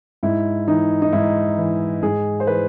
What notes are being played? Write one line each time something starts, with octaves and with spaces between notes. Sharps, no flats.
G#2 E4
E3 D#4
D#4
G#2 E4
E3
G#2 G#4
C5
E3 B4